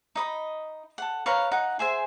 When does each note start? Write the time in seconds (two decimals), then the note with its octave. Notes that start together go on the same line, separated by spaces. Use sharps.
0.15 D#4 D#5 B5
0.98 A4 F#5
1.26 B4 C#5 F5 A#5
1.51 D#4 F#5
1.79 G#4 C5 E5 G#5